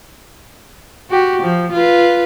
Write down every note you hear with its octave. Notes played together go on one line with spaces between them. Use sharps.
F#4 G4
F3
F4 B4